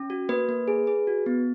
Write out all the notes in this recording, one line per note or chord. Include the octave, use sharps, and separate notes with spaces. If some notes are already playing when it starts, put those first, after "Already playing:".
Already playing: C#4
F#4
A#3 B4
A#3
G#4
G#4
F#4
B3